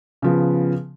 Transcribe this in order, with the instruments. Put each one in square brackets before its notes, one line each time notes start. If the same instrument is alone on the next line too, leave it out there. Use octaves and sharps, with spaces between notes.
[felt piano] C#3 F3 B3